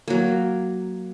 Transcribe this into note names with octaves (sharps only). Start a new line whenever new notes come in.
F#3 A#3